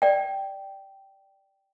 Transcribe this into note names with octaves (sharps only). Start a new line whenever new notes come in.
D5 G5